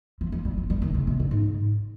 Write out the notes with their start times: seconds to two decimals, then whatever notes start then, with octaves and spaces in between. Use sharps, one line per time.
0.21 F3
0.32 F3
0.45 G3
0.57 F3
0.70 G3
0.82 D#3
0.94 C#3
1.07 C3
1.20 A#2
1.31 G#2